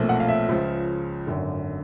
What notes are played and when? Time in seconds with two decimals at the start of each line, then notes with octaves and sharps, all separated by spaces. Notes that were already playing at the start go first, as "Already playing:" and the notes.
Already playing: B1 A#2 F3 A3 C4
0.09 F#5
0.20 F5
0.28 E5
0.48 C#2 C#3 F3
1.27 G#1 F#2 D3